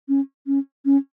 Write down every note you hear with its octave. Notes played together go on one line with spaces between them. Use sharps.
C#4
C#4
C#4